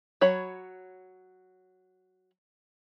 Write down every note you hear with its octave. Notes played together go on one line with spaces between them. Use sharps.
F#3 C#5 B5